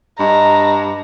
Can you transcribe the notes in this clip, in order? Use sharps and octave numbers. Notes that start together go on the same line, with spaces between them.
G2 D#5 A#5